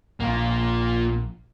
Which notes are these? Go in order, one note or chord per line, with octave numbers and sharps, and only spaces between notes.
A#1 A#3 F4